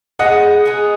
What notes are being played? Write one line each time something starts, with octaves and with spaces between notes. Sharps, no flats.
G#3 B3 D#4 G#4 D#5 F#5
G#3 B3 D#4 G#4